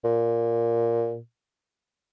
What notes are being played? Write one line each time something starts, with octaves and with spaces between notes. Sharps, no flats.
A#2